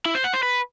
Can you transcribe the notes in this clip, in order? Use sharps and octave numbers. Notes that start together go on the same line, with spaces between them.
E4
C5
F#5
C5
B4